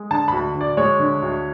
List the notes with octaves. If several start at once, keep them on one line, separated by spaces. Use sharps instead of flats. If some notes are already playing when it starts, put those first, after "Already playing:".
Already playing: G#3
D3 A5
D2 B5
D2
D5
G#3 C#5
D3
D2